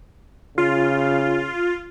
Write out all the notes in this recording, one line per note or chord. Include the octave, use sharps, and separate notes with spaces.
C#3 F4